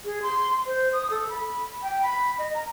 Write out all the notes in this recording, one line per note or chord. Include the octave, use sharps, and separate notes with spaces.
G#4
C6
C5
D#6
A4
B5
G5
B5
D#5
A#5